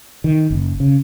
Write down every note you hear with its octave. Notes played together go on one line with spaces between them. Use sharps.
D#3
F#1
C#3